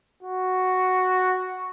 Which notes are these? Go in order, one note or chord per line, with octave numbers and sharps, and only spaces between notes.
F#4